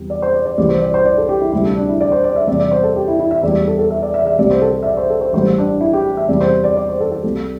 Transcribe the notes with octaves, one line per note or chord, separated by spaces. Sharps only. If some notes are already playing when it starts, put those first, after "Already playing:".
Already playing: E2 C3 G3
D5
C5
D5
D5
C2 C3 E3 G3 D5
C5
D5
C5
D5
A4
G4
E4
D2 C3 G3 E4
D4
D4
E4
D5
C5
D5
E5
E2 C3 G3 D5
D5
C5
A4
G4
E4
E4
E5
E2 E3 G3 D5
A4
A4
E5
D5
E5
D5
E5
C2 C3 G3 D5
C5
A4
E5
D5
C5
A4
C5
A1 G2 G3 C5
D4
E4
G4
E5
E2 C3 G3 D5
C5
D5
D5
C5
A4
A4
C2 C3 G3